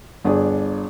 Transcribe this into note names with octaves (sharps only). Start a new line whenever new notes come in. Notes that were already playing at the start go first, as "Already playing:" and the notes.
G1 D4 G#4